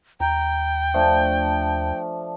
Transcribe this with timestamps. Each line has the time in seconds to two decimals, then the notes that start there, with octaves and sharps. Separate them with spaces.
0.20 D#2 G5 A#5
0.94 F3 A3 D4